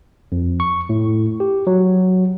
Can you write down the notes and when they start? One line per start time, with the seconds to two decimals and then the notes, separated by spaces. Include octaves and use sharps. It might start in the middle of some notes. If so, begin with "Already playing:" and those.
0.32 F2
0.60 C#6
0.89 A2
1.40 G4
1.67 F#3